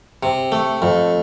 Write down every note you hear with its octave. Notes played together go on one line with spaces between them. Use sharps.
C3
A3
F2